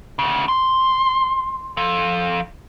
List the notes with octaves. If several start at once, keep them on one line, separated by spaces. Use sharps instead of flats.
D2 C#3
C6
F3 A4